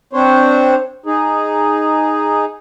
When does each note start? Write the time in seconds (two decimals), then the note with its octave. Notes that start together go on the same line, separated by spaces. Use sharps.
0.13 C4 D4 C5 C#5
1.06 D#4 G#4